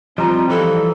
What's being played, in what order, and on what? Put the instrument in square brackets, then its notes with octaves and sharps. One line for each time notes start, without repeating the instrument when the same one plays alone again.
[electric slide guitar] F3 G3 [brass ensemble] C4 [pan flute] F4 [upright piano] D#5 A#5
[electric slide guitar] E3 [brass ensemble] F3 G3 [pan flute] A4